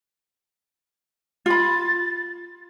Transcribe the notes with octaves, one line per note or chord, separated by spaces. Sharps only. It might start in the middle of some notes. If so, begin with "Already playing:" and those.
F4 B5 A6